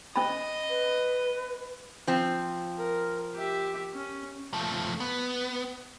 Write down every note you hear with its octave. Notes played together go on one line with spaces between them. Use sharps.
C#4 D#5 B5
B4
F3 C4
A#4
G4 E5
C#4
F3 A3
B3